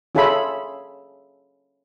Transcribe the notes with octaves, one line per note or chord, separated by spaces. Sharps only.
C#4 F4 G#4 A4 E5 B5